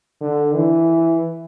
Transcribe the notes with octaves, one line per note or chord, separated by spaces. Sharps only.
D3
E3